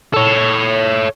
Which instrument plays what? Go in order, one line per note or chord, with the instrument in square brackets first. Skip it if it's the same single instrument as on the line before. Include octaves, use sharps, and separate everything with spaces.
[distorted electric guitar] A4 C#5